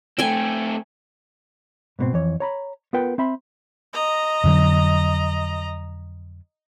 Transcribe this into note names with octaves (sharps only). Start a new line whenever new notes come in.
A3 C4 G5 G#5
G#2 B2 C4
F2 E3 C#5
C#5 A#5 B5
B3 F4 A#4 B4 F#5 G5
C4 E5 B5 C6
D#5 A#5
F2 D3 F#3